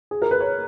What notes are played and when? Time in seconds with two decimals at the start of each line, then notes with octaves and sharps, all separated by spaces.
0.11 G#4
0.22 A#4
0.31 B4
0.40 C#5